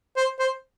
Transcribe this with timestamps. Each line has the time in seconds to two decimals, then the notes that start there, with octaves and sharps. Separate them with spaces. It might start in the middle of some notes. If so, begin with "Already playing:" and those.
0.17 C5
0.39 C5